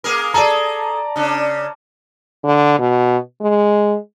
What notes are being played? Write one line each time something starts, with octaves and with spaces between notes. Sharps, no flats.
A#3 G#4 A#4
G#4 A4 D5 A5 A#5
C#3 D4
D3
B2
G#3